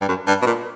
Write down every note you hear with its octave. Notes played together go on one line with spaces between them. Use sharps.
G2
F#2
G2
B2
A#2